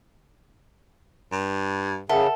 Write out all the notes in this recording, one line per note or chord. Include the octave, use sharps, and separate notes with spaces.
G2
C#3 A4 A#4 E5 F#5